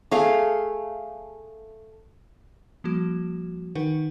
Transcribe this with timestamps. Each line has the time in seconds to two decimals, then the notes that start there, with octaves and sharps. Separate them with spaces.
0.11 A3 G#4 F5
2.84 F3 G3 A#3 F#4
3.75 D#3 D#4 A#4 B4 F#5